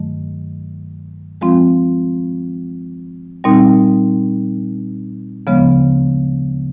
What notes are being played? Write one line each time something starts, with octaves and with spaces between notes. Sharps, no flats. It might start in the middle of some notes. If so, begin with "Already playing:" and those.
Already playing: G2 D#3 F#3 A3
F3 G#3 C4 F4
A#2 G3 C4 D#4
D2 C#3 F3 G#3 B3